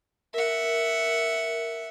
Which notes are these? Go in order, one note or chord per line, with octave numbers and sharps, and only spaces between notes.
A#4 E5 F#5